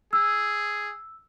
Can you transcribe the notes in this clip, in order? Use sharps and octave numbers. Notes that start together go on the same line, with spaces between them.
G#4 E6